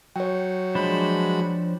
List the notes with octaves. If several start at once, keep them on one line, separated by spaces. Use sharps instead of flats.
F#3 C#5 G5
F3 G#3 D4 C5 B5